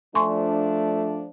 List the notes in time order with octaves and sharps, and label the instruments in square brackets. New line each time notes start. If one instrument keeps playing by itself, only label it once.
[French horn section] F3 D4 [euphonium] A3 [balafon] G#5 C6 C#6